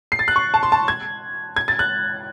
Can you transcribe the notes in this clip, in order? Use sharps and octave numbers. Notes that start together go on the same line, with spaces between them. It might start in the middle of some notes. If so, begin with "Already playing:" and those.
C7
A6
F#6
C#6
A5
C6
A5
G#6
G#6
A6
F#6